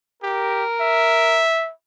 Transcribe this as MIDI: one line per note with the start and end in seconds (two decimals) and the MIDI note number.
0.23 0.64 67
0.23 1.44 70
0.80 1.71 76